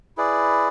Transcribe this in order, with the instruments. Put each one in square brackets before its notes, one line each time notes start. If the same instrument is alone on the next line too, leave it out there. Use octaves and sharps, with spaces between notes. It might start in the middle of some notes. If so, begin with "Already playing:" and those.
[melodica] E4 G#4 B4 D5